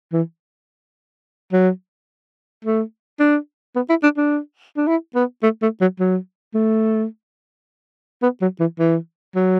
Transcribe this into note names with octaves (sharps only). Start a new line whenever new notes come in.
E3
F#3
A3
D4
B3
E4
D4
D4
D4
E4
B3
A3
A3
F#3
F#3
A3
B3
F#3
E3
E3
F#3